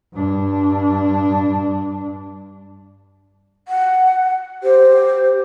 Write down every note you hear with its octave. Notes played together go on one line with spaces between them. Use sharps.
G2 D4
F#5
G4 C5